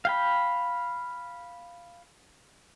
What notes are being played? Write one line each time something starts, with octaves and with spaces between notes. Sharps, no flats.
F5 G5 B5